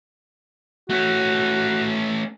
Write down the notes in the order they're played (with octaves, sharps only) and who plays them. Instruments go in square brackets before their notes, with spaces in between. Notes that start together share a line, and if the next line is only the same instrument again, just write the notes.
[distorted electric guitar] A3 C#4 [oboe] F#4